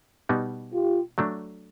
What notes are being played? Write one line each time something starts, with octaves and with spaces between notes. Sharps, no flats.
B2 G3 B3 D#4
F4 G4
F#3 A3 D4